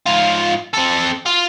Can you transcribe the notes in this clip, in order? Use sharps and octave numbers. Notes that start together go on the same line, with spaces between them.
G#2 F4
C4 A4
F4